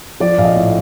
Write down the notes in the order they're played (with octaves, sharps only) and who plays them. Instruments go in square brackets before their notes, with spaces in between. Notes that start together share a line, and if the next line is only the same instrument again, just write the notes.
[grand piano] F3 D5
A#1 F5
D#5
A2